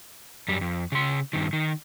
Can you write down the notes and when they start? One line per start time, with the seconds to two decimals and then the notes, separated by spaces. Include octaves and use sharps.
0.48 F#2 G3
0.61 F2
0.92 C#3 C6
1.33 G2 D#3
1.53 D#3